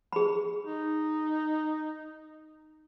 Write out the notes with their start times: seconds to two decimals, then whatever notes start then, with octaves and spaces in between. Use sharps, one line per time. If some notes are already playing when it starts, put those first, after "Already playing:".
0.13 G#4 B5
0.66 D#4